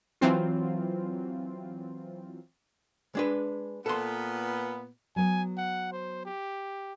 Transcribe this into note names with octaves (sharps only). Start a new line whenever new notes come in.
E3 F#3 C4 F4
G#3 D4 B4
A#2 B3 A4 C6
F#3 B3 G#5
F#5
C5
G4